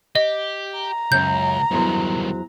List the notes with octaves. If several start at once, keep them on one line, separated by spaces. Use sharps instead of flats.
G4 D#5
A#5
C#2 F#2 C#4 G6
E2 G2 D#3 F#3 C5